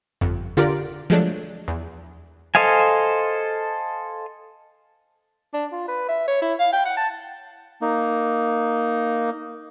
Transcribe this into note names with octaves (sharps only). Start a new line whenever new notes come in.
G1 F2
D3 F4 G4 A#4 D5 D7
F3 F#3 G#3 A3 D4
E2
A4 C5 D#5 F5 G#5
D4
F4
B4
E5
C#5
E4
F5
G5
F#5
A5
A#3 D#4